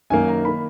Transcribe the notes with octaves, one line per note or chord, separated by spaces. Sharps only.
F#2 D#3 A#3 G#5
A#5
D#3 A#3 B5